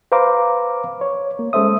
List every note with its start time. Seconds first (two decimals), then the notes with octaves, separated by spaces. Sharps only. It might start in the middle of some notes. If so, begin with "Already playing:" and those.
0.12 B4 C5 F5 A#5 D6
1.01 C#5
1.39 A#3
1.53 G#3 C#4 A4 C5 E5 D#6